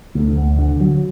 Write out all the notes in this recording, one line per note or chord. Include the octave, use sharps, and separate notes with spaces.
D2
D2
D3
F#3